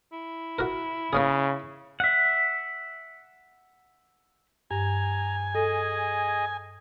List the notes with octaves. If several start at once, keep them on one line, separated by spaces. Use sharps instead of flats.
E4
F#4 A#4
C#3 A#3 C#4 G#4
E5 F#5
G2 G#5 A#5
G#4 A4 D#5